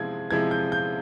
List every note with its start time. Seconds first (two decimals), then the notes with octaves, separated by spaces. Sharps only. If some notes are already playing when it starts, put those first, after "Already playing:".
Already playing: C3 F3 G#3 E4 G#6
0.31 C3 F3 G#3 E4 G#6
0.51 G6
0.72 G6